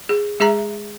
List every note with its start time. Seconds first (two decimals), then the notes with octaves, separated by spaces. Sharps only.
0.09 G#4
0.40 G#3 G#4 E5 A#5